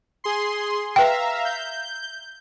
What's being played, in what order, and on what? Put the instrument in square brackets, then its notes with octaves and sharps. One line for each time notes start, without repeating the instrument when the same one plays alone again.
[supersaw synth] G#4 C6
[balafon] B4 G5 [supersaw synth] E5 F5 A#5
[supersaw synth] G6